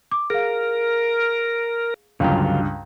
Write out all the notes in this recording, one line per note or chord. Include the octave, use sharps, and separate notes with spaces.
D6
G#4 A#4 F5
C#2 G2 D3 F#3 F4 F5 G5 A#5